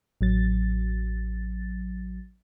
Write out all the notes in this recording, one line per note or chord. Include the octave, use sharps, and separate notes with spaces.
A1 F#3 A6